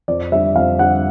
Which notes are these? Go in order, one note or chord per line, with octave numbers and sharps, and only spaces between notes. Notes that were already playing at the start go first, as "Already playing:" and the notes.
F2 D5
D3 G3 E5
F2 F5
D3 G3 F#5